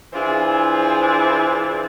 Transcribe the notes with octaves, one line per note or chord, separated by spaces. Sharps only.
E3 D4 E4 F4 G#4 C5